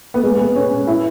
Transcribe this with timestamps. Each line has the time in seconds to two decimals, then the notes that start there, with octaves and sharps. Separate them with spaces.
0.14 B3
0.24 G#3
0.39 B3
0.56 C#4
0.87 E4